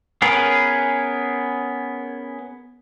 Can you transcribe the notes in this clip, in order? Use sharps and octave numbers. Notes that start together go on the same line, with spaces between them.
B3 C#4 G#4 A#4 B4